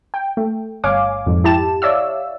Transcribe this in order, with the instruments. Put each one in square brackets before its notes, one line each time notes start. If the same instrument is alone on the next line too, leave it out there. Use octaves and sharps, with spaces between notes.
[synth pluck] G5
A3
G1 C#5 F5 G#5 D6
F2 G#2
E4 G4 A5 E7
C#5 D5 E5 F5 E6